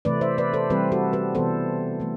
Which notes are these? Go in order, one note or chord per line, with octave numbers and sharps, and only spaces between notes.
C3 E3 A3 C4 B4 D5
C5 E5
B4 D5
A4 C5
E3 G3 C4 G4 B4
F#4 A4
G4 B4
C3 E3 B3 A4 C5
E3 A3